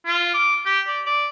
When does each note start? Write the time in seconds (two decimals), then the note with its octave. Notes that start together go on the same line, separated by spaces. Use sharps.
0.06 F4
0.34 D6
0.66 G4
0.87 D5
1.06 D5